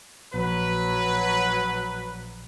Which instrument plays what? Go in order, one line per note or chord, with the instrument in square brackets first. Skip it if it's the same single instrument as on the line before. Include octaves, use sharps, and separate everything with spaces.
[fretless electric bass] A#1 [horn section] F#3 B4